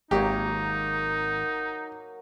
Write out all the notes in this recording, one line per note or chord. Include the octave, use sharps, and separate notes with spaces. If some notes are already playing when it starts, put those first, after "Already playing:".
G#1 F#3 A#3 D#4 G4